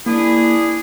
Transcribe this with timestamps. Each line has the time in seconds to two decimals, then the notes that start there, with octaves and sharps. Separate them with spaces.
0.06 A#3 D4 E4 G#4